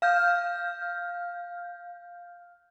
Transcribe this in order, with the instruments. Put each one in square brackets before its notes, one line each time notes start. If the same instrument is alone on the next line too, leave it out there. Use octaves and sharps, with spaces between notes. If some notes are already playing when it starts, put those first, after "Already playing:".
[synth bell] F5 F6 G6